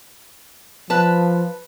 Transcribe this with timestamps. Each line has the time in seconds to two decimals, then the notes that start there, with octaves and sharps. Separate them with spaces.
0.90 F3 B4 A5